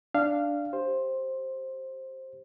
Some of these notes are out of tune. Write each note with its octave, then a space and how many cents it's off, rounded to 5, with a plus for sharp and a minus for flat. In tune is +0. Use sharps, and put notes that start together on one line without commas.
D4 +0 F5 -15
G4 +0 C5 +10